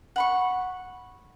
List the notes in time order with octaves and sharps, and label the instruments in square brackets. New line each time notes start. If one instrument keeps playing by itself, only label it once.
[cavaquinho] F#5 B5 C#6